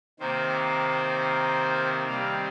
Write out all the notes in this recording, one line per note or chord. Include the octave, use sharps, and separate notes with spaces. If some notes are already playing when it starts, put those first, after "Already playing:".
C3 D#3 A#3 C5
D#3 G3 C4 F5